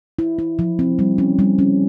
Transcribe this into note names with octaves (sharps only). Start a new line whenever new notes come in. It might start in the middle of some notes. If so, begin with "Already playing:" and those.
E4
E4
F3
C4
G3
C#4
G3
C#4